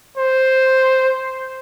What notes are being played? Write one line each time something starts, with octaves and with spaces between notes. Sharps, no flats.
C5